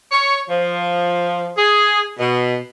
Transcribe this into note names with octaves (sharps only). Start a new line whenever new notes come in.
C#5
F3
G#4
B2